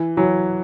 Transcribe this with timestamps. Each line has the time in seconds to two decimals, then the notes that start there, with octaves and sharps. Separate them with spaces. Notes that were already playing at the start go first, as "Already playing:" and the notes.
Already playing: E3
0.17 E3 F#3